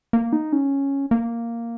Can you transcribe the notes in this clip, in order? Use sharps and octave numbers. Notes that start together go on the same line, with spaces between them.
A#3
D#4
C#4
A#3